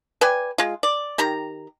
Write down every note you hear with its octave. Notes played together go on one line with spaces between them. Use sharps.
B4 D5 G5 G#5
G#3 F4
D5
D#3 G4 A#5